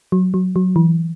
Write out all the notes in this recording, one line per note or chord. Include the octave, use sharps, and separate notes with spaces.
F#3
F#3
F#3
E3